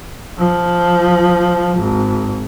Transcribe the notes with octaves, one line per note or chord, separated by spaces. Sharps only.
F3
G#1